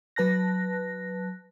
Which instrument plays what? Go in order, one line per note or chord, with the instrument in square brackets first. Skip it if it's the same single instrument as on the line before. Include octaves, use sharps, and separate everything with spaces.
[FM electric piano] F#3 B4 A5 F#6 A#6